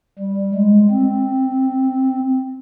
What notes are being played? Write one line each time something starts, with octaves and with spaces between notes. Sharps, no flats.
G3
G#3
C4